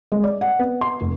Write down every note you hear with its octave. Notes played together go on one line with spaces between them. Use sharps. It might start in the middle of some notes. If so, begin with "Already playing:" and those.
G#3
D5
F#5
B3
C6
F1